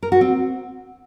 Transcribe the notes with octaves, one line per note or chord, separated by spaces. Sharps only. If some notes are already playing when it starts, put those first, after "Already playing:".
A#4
F#4
C4